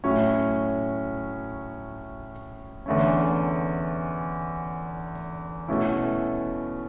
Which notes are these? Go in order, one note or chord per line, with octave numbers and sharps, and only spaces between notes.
A2 F#3 A3 C#4
E2 D3 A3 C#4
B2 A3 C#4 E4